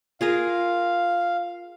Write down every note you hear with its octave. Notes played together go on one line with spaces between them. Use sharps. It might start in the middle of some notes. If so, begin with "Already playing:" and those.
F4 G#4 A#4 F5